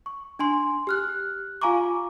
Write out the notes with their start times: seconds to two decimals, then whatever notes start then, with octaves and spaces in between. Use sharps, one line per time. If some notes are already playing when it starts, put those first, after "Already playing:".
0.06 C#6
0.39 D4 G#5 C6
0.87 G4 F6 F#6
1.62 F4 F5 G#5 A#5 C#6 D6